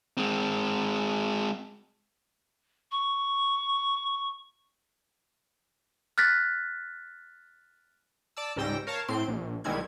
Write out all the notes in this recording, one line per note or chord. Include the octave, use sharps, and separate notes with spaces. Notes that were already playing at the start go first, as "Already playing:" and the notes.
G#3 C4
C#6
F6 F#6 A6 B6
D5 A5 E6
C#2 G#2 G3 G5 E6 A#6
A#4 C#5 F5 A5
A2 C4 C6 D7
A#1
B1 D#3 G3 G#3 E4 G#6